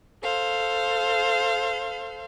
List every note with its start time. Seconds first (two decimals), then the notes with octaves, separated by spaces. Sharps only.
0.23 A4 C5 F5